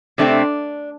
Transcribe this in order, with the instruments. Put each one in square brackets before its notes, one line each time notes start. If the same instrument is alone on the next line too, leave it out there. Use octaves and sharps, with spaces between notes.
[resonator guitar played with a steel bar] C3 A3 C4 D4